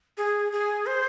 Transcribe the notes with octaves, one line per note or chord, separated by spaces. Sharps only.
G#4
G#4
C5